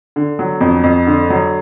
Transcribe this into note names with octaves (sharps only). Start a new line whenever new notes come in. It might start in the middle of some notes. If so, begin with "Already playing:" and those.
D3
F#3
F2
F2
D3
F#3